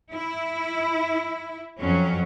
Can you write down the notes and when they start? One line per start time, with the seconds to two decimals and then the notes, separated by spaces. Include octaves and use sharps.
0.15 E4
1.80 F2 F#3 C#4